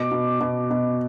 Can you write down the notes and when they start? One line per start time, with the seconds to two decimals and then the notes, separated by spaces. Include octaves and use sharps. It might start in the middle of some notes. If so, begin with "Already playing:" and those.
Already playing: B2 D6
0.11 B2
0.40 B2
0.70 B2